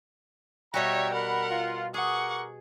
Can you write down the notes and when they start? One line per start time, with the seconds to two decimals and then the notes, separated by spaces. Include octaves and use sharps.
0.74 B2 G3 F#4 C#5 E5 G5 A#5
1.14 A#4 F#5 B5
1.50 F4
1.94 G#4 A#4 F#5 C#6 D6